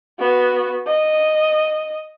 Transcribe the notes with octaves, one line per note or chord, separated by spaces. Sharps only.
B3 F#4
D#5